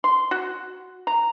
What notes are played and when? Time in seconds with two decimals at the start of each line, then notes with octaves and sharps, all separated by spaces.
0.04 C6
0.31 F#4
1.07 A#5